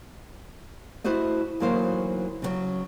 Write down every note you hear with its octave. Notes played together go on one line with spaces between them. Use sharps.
A3 E4 F#4 C5 D#5
D2 E3 F#3 A#3 D#4 C5
C#3 E3 F#3